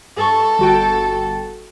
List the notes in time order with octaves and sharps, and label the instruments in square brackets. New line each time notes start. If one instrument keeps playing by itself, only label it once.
[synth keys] G2 C#6 [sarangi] A4
[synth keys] G1 F#4 G5